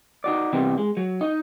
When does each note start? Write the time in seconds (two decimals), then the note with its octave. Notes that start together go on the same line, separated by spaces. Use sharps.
0.24 D#4 F#4 D5
0.53 C3 E3 G3 B3 C4
0.78 G#3
0.97 F#3
1.21 D#4